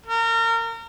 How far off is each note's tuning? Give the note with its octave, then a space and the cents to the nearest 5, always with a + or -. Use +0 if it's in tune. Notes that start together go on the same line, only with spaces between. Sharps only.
A#4 -30